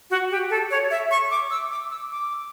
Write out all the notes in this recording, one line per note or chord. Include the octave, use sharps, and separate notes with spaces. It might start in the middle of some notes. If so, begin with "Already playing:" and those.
F#4
G4
A4
C#5
E5
C#6
D6
E6
D6
E6
D6